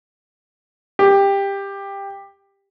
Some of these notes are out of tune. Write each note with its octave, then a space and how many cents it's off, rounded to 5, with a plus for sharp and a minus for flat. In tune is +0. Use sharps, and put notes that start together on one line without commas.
G4 +15